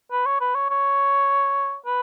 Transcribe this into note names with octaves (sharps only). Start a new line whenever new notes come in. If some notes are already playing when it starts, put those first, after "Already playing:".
B4
C#5
B4
C#5
C#5
B4